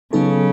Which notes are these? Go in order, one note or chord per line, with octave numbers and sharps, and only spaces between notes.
C#3 F#3 B3 D#4 A4